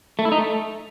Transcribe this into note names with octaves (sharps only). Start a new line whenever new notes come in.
A3
E4
D#4
A3